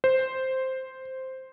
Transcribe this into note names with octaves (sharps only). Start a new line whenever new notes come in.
C5